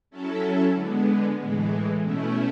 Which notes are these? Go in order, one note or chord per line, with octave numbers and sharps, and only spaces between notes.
F#3 C#4 E4 A4
D3 G#3 B3
A2 E3 G#3
B2 A3 C#4 E4